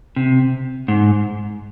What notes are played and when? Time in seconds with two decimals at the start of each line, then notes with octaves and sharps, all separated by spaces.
0.16 C3
0.88 G#2